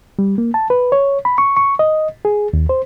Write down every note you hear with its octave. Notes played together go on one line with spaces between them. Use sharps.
G3
A#3
A5
B4
C#5
B5
C#6
C#6
D#5
G#4
D#2
C5